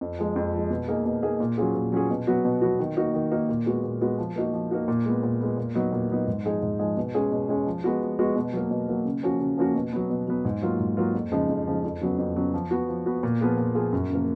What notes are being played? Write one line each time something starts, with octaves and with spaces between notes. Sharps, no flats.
F2
F3 G#3
F2
F3 G#3
B2
A#3 D#4 G#4
B2
A#3 D#4 G#4
A#2
F#3 C#4 F4 G#4
A#2
F#3 C#4 F4 G#4
B2
F#3 B3 F#4
B2
F#3 B3 F#4
D#3
A#3 D#4 F#4
D#3
A#3 D#4 F#4
A#2
G#3 B3 F#4
A#2
G#3 B3 F#4
F3
A#3 D#4 F#4
F3
A#3 D#4 F#4
A#2
G#3 B3
A#2
G#3 B3
A#2
F#3 B3 D#4
A#2
F#3 B3 D#4
G#2
F3 G#3 D#4 G#4
G#2
F3 G#3 D#4 G#4
B2
G#3 C#4 G#4
B2
G#3 C#4 G#4
F3
G#3 B3 F#4
F3
G#3 B3 F#4
B2
F#3 A#3
B2
F#3 A#3
C#3
F3 A#3 C#4 F#4
C#3
F3 A#3 C#4 F#4
B2
F#3 B3
B2
F#3 B3
G#2
F#3 A#3 F4
G#2
F#3 A#3 F4
F2
C#3 F3 G#3 D#4
F2
C#3 F3 G#3 D#4
F2
C#3 F#3 B3
F2
C#3 F#3 B3
F3
B3 F#4
F3
B3 F#4
A#2
F3 B3 F4 G#4
A#2
F3 B3 F4 G#4
F#2
C#3 F3 A#3